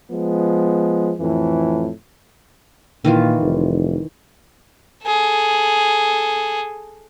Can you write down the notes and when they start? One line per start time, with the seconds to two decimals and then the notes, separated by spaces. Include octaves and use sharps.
0.11 F3 G#3 B3
1.20 F2 A2 E3
3.04 A#2 D#3 E3 F4
3.41 F1
5.03 G#4 A4